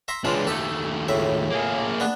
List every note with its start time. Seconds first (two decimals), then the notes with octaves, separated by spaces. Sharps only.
0.08 E5 A#5 C6
0.25 C#2 E3 G#3 D4 F4
0.47 D#2 A3 G4 A4
1.08 C#2 A2 E5
1.50 A#3 G#4
2.00 B3 D4